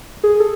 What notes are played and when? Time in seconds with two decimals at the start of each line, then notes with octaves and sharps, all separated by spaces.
0.24 G#4
0.40 A4